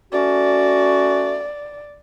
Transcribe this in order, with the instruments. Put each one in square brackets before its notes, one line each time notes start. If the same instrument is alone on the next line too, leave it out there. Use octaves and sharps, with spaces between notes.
[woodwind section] A3 C#4 F#4 [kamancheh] D5